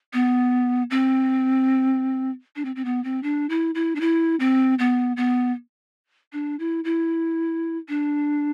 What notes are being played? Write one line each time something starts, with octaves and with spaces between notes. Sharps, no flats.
B3
C4
D4
C4
C4
B3
C4
D4
E4
E4
D4
E4
C4
B3
B3
D4
E4
E4
D4